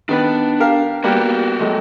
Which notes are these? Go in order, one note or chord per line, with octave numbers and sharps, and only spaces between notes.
D#3 B3 D4 B4
G4 A#4 F5
G3 A#3 B3 F#4 G4
F#3 G#3 A3